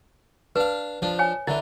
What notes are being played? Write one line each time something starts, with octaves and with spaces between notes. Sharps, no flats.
D4 B4 F5
F3 D4
C#5 G#5
D3 E3 E4